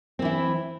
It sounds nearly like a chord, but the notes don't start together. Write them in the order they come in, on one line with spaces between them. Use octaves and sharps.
C4 E3 E4